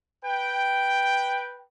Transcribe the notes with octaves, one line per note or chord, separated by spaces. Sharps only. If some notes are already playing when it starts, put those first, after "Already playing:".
B4 G5